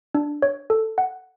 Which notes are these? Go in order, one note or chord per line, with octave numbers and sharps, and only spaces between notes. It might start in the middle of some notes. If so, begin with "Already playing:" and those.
D4
C#5
A4
F#5